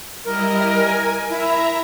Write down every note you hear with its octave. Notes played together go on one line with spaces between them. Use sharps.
G3 E4 A#4 D#5
G#5
E4 E5 A#5